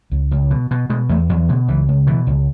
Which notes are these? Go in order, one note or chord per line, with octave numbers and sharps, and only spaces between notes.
C#2
C#2
B2
B2
B2 G#3
E2 A3
E2 F#3
B2 D3
C#2 E3
C#2
B2 E3
C#2